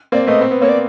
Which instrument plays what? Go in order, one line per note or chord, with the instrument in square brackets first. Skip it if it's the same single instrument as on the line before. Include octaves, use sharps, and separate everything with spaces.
[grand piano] A#3 C4 [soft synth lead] D5
[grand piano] A3 B3 [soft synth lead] D#5
[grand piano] C4
B3
[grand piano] A#3 C4 [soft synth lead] C#5
[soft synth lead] D5